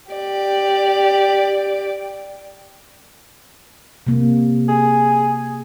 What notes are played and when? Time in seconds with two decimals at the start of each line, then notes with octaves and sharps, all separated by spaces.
0.12 G4 D5
4.07 C3 A#3
4.69 G#4